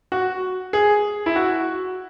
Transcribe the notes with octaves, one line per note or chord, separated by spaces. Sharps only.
F#4
G#4
E4
F#4